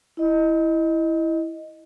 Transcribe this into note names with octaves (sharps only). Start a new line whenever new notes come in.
E4 D#5